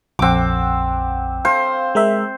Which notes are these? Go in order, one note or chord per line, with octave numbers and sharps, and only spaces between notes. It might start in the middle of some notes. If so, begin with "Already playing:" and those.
A#1 F2 C4 F#5 D6
C5 F5
G#3 A#4 E5